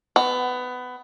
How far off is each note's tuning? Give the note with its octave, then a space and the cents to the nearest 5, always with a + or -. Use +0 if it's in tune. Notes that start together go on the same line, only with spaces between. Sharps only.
B3 +20